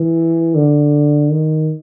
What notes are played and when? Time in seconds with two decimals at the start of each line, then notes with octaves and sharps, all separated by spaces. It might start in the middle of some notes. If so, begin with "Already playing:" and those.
Already playing: E3
0.55 D3
1.31 D#3